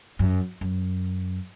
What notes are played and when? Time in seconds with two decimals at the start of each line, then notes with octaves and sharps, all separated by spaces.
0.19 F#2
0.61 F#2